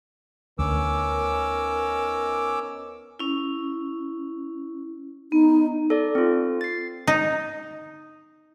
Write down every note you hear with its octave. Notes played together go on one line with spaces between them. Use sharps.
D2 B3 C#4 D#4 A#4 D6 E6
C#4 E4
B3 D#4
A4 D5
C4 F4
A6 C7
D#4